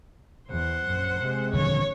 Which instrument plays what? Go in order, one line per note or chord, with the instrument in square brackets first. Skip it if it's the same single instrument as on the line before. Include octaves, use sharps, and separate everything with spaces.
[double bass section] E2 [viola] C5 F#5
[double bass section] A#1 F#2
C3 G#3
[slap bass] D#1 D3 F3 [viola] C#5